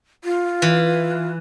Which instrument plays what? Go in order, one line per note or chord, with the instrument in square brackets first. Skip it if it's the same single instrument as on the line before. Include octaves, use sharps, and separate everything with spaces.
[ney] F4
[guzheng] E3